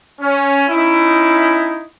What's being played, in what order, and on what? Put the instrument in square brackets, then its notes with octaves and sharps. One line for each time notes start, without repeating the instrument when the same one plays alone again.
[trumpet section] C#4
C#4 D#4 E4